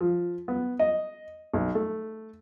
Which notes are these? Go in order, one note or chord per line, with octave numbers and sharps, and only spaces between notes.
F3
B3
D#5
B1
A3